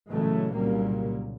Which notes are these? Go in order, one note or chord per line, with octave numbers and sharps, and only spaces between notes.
A#2 C#3 E3 F#3 G#3 A3
C2 A#2 C#3 F#3 G3 A#3